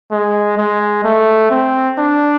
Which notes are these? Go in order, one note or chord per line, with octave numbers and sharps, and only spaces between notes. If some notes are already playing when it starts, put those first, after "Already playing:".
G#3
G#3
A3
C4
D4